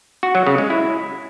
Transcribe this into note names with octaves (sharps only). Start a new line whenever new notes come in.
F#4
F#3
C#3
G#3
E4